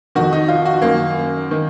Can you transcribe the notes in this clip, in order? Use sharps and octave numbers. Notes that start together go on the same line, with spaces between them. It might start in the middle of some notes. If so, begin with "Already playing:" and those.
F2 D#3 F#4
D#4
F4
F#4
F#2 D#3 A#3
D#3